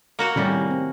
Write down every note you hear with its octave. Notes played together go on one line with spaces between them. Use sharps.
A#3 F#4 F#5
A2 C3 D#3 G3 C#4
C4